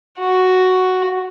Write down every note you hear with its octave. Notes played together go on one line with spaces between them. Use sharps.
F#4